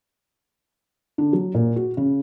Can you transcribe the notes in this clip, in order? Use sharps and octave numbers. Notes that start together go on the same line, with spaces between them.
D3
F#3
A#2
F#4
C#3